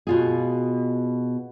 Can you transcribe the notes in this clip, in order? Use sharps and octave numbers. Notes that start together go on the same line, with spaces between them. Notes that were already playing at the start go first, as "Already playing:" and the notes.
B2 F4 G#4